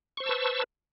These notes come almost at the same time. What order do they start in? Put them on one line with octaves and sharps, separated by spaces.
C#6 C5 E6 A5 B4